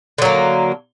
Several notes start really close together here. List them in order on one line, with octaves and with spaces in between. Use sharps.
D3 F#3 A#3